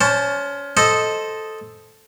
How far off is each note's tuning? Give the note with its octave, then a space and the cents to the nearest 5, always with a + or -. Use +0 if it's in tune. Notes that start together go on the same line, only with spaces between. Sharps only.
C#4 +25 C5 +5 A5 +0
A4 -5 C5 +0 D#5 +0